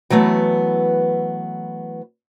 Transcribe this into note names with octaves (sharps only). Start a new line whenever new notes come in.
E3 F#3 A3 B3